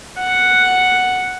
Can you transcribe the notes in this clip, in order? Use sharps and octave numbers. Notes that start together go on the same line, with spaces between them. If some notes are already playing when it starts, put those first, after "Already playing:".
F#5